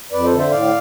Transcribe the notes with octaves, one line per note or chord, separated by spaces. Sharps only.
F2 B4 D5
A4 C5
D3
C5 E5
A2 D5 F5